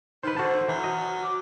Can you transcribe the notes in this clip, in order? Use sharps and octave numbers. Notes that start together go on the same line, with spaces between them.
D#3 D#4 B4 C5
D3 F#4 C5 A5
E3 F#3
F#4 D#5
D6